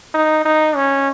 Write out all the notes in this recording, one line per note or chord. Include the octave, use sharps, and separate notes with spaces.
D#4
D#4
C#4